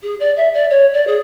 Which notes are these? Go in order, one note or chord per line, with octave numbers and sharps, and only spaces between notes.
G#4
D5
E5
D5
C#5
D5
G#4